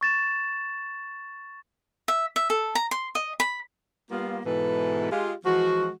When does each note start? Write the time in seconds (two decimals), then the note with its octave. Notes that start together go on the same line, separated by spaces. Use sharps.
0.01 C#6 A6 E7
2.08 E5
2.36 E5
2.50 A4
2.75 A#5
2.91 C6
3.15 D#5
3.40 B5
4.11 G3 A#3 B3 F4
4.45 G#2 B2 E3 E4 A4 B4
5.12 G#3 F4 G4
5.45 E3 F3 G#3 F#4